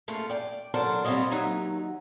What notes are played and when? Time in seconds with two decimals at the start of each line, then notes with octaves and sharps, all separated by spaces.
0.08 C#3 A3 A#3 F4
0.30 D5 G5
0.74 F#3 D4 A4 A#4 C5 D5
1.05 G3 C4 F4 C5 C#5 D#5
1.31 D#2 F#3 D#4 E5